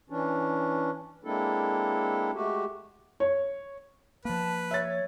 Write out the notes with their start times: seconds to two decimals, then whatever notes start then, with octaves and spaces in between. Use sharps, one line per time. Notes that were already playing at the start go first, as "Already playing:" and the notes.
0.10 E3 C#4 D4
1.24 G#3 A#3 C4 D4 E4 A4
2.34 G#3 A3 F#4 G4
3.20 C#5
4.25 F3 A#3 B4 A5
4.71 C#5 E5 A6